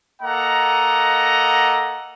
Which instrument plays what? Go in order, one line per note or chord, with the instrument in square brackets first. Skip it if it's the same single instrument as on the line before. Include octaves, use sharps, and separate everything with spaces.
[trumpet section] A#3 A4 D#5 F#5 A#5